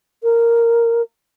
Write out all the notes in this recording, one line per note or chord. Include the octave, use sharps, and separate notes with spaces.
A#4